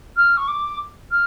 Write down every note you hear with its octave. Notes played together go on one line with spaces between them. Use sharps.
F6
C#6
D6
F6